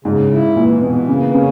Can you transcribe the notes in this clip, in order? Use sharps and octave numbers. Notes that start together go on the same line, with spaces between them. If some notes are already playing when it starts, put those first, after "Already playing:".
G#2 C#3
E4
A#2 E3
B2 E3
C#3 A#3
C#3 C#4